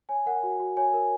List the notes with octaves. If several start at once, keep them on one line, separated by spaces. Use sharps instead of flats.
C#5 G#5
A#4 F#5
F#4
F#4
C#5 G#5
A#4